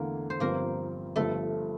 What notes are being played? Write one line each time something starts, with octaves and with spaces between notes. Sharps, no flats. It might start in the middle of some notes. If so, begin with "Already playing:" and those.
Already playing: E2 D3 A3 A#3 E4 A#4
C5
G1 G2 F3 A#3 C4 A#4
G1 G2 F3 A3 A4